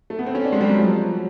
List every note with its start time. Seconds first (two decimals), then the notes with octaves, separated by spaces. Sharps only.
0.10 A3
0.19 B3
0.26 C4
0.35 C#4
0.44 D4
0.52 G#3
0.61 G3
0.69 F#3
0.78 F3
1.12 F#3